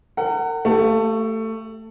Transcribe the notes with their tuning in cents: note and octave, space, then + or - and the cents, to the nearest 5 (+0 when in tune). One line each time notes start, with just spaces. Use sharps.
A#4 -35 F#5 +20
A3 +15 G4 +0 F5 -20